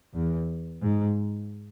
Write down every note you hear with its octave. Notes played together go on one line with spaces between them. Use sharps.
E2
G#2